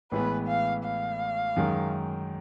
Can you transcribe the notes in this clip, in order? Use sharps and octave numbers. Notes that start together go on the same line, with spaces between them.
A1 A2 E3 G#3 B3 B4
F5
F5
F#2 D#3 G#3